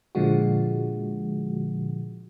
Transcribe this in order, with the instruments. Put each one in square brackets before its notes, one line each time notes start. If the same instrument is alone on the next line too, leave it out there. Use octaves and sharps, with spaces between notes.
[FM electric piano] A#2 D3 F3 G#3 F#4